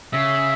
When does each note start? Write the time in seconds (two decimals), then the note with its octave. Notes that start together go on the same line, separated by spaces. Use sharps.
0.14 C#3 E5